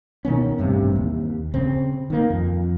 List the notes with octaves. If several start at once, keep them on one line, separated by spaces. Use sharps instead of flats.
B2 D#3 B3 C#4
A1 G2 C3
D#2
C#3 C4
D#3 A#3
F2